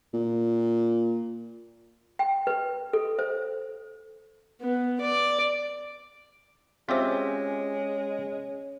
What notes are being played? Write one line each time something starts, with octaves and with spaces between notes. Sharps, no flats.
A#2
G5
B4
A4
C5
B3
D5
G#3 C4 C#4 F4 G4 C5 E5